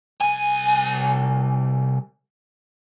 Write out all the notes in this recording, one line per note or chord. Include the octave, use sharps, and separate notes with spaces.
C2 G#5